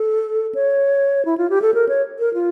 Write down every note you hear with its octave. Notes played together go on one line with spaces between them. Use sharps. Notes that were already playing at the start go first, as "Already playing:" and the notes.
Already playing: A4
C#5
E4
F4
G4
A4
A#4
C#5
A#4
F4